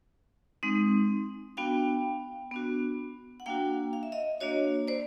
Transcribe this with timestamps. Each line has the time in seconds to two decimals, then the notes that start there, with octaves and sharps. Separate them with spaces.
0.63 G#3 C4 D#4
1.57 B3 D4 F#4 F5 G5
2.51 B3 D4 F#4
3.40 F#5
3.46 A#3 D4 F#4 F5 G5
3.93 F5
4.03 E5
4.12 D#5 F5
4.40 A#3 D4 F#4 C#5 D#5
4.88 C5 D5